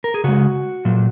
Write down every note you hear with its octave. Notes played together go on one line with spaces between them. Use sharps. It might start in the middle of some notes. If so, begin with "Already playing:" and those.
A#4
G#4
C#3 G#3 F#4
A#2 F#3